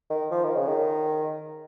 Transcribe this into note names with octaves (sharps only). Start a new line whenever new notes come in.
D#3
F3
D#3
C#3
D#3